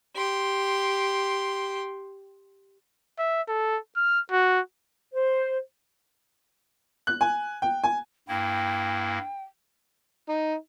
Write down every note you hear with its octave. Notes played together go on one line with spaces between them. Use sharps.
G4 C6
E5
A4
F6
F#4
C5
F#6
G#5
G5
G#5
G2 A#3 E4 G5
D#4